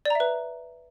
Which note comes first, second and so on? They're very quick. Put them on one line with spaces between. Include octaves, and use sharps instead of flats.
D5 A#5 E5 B4